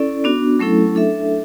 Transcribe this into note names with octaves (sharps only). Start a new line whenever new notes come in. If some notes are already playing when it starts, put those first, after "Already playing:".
Already playing: C#4 E4 A4 D5
B3 D4 F#4
F#3 A3 C#4 E4 A4
D4 A4 E5